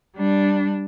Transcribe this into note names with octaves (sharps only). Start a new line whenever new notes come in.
G3 D4